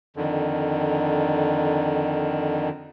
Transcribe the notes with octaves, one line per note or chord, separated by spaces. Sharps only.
F2 D3 D#3